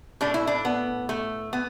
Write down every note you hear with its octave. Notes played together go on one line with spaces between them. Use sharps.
A2 A3 D4
E4
D4
B3
A3
B3